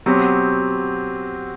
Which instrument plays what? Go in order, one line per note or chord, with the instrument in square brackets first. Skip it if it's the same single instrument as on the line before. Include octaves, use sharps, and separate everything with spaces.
[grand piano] B2 F#3 C4 G4